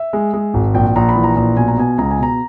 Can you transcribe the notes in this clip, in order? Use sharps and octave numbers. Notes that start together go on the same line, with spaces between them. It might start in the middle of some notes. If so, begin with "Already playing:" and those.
Already playing: E5
G#3
G#3
G#1
A#1 G5
A#1 A#5
B5
E3
A#5
A#1
B2 G#5
A#5
B2 G#5
C#2 A#5
G#5
B2 A#5